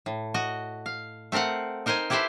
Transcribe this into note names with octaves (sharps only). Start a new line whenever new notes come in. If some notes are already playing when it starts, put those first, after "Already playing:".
A2
F#4 D#5
F5
A3 C4 A#4 F5 F#5
D#4 A#4 C5 D#5 G#5
E4 G4 A4 B4 C5 E5